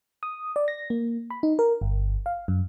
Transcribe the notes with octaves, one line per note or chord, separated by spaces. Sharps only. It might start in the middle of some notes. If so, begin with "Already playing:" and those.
D#6
D5
A#6
A#3
B5
D#4
A#4
G1
F5
F#2